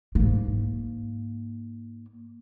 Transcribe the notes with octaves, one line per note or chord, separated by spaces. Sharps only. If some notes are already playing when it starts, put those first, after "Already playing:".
G#2 A#3